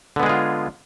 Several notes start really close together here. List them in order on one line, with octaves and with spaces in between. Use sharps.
D3 B3 G#3 G#4 F4